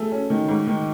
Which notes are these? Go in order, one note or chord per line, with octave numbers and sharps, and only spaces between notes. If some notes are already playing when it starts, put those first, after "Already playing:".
Already playing: A3 G#4
C#4
D#3
G#2
D#3